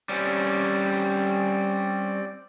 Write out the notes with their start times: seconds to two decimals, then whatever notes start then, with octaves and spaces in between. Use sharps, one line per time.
0.09 G3 C4 C#4 D5 G5